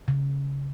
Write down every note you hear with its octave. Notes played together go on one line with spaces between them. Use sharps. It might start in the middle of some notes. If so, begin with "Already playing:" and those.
C#3